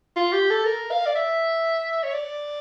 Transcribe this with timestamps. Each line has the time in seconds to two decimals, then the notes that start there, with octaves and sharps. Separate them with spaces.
0.16 F4
0.33 G4
0.50 A4
0.66 A#4
0.91 F5
1.06 D5
1.15 E5
2.03 C#5
2.14 D5